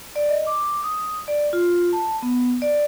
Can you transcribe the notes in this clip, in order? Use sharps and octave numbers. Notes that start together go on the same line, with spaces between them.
D5
D#5
D6
D#6
D5
F4
A5
B3
D5